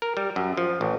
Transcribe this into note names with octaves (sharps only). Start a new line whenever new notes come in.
A#4
G3
F#2
F3
A1